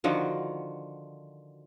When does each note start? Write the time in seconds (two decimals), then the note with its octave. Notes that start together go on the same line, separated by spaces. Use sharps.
0.04 D3 D#3 F3 F#4